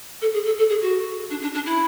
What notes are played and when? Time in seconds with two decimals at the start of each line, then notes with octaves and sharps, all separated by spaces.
0.21 A4
0.33 G#4
0.46 A4
0.58 A4
0.69 G#4
0.82 F#4
1.30 D4
1.42 D4
1.54 D4
1.66 E4